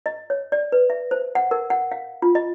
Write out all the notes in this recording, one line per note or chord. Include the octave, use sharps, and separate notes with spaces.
D#5
C#5
D5
B4
E5
C5
F#5
A#4
F#5
F5
F4
D#5